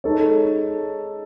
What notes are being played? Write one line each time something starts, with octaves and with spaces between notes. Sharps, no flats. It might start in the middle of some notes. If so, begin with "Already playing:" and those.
G#3 D#4 A4 C#5